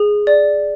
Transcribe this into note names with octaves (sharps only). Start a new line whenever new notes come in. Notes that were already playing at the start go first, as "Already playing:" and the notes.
Already playing: G#4
D5